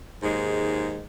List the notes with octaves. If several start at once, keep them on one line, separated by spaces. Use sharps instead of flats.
D#2 G#2 G#3